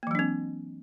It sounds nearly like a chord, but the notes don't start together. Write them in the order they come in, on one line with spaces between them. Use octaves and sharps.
A#3 E3 F#3 D4 C4